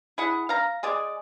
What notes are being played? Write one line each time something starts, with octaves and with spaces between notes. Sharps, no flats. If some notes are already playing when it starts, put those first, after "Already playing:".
E4 G#4 F#5
F5 A#5
G#3 G#4 D5